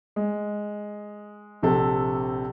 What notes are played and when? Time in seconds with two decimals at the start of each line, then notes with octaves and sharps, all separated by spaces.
0.16 G#3
1.63 A#1 C3 A4